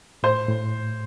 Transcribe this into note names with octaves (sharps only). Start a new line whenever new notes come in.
A2 C5
A2